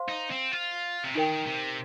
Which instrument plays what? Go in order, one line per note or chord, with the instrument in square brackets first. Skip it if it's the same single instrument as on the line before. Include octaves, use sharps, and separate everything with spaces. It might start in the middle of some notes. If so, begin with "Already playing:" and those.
Already playing: [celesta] C5 F5 C6
[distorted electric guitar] D#4
C4
F4
C3
[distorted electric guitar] D#3 [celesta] D#4 A#4 G5
[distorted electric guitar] C3